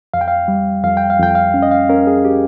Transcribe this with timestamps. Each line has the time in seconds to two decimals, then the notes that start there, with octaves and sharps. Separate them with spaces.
0.14 F2 F5
0.21 G5
0.28 F5
0.48 G3
0.84 F2 F5
0.97 G5
1.10 F5
1.19 F2 G5
1.35 F5
1.54 C#4
1.62 D#5
1.71 F5
1.89 C#4 A#4
2.07 G#4
2.25 G4